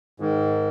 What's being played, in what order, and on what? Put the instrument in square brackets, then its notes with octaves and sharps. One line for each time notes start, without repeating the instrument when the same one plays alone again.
[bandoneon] G#2 D#3